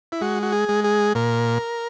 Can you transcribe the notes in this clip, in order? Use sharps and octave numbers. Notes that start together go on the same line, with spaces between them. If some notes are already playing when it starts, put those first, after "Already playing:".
E4
G#3 F#4
F#4
G#4
G#3
G#4
A#2 A#4